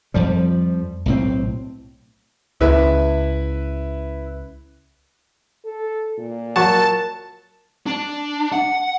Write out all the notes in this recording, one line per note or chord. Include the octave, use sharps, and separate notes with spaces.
F2 F3 G3
B1 A2 C4
C#2 E4 B4 E5
A4
A#2
F#3 A#4 F#5 A5 C#6
D4
F#5